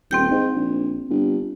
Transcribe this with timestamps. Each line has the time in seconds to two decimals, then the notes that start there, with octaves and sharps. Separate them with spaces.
0.11 D#1 C4 G5 G6
0.31 G#2
0.55 A#1
1.10 G1